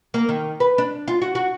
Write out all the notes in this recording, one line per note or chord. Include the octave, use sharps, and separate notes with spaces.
A#3
D#3
B4
D4
F4
F#4
F#4